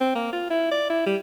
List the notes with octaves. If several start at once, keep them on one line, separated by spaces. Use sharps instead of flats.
C4
A#3
F4
E4
D5
E4
G3